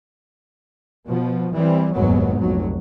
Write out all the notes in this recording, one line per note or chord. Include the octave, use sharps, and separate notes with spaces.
B2 F3
E3 G3 C4
F1 D#2 G#2 F#3 B3
F1 B1 F#3